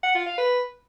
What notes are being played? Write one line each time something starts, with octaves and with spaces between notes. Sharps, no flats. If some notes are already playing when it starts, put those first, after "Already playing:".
F#5
F4
F5
B4